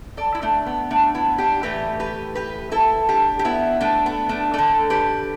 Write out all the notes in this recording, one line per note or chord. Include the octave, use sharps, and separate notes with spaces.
A4 D5
E4
A3 D4
B3
A3 D4
B3 E4
D4 G4
A2 E3 A3 G4 B4
G4 B4
G4 B4
E4 A4
D4 G4
G4
B3 E4
A3 D4
B3
A3 D4
D3 A3 A4 D5
G4 B4